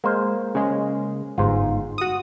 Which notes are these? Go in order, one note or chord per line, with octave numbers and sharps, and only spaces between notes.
G#3 A#3 C5
C#3 G#3
G1 G#2 F4
F#4 D#6